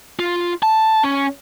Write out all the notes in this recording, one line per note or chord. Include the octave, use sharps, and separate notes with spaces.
F4
A5
C#4